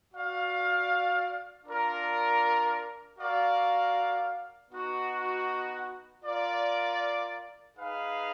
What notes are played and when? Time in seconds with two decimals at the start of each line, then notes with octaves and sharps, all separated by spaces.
0.12 F#4 D5 F5
1.65 D4 F4 A#4 D5
3.18 F#4 A#4 D5 F5
4.71 B3 D#4 F#4
6.24 F4 A#4 D5
7.76 D#4 G#4 B4 F5